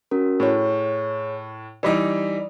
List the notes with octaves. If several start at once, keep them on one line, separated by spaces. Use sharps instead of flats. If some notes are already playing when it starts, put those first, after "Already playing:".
C#4 F#4 A#4
A2 G#4 C#5
E3 G3 D#4 D5